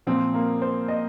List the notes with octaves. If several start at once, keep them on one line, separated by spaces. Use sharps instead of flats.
A#2 F3 C4
A#3
C5
D#5